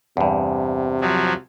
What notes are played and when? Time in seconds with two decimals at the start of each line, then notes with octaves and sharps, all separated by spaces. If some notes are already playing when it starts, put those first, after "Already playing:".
0.17 E2 G2 C3
1.01 F3 F#3